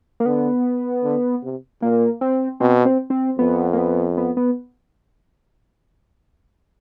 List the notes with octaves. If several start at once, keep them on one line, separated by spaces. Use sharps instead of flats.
A#3
D3 B3
D3
C3
A#2 A#3
C4
B2 C4
C4
C4
F2 B3
A#3
B3
B3
B3